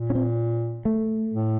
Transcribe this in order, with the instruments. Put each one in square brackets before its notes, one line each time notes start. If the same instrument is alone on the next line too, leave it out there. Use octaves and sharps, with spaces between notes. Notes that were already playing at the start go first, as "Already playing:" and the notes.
Already playing: [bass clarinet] A#2
[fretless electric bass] C#4
C4
A3
[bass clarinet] A2